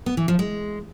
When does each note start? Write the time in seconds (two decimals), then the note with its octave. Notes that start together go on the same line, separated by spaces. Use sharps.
0.06 B3
0.17 E3
0.28 F3
0.39 G#3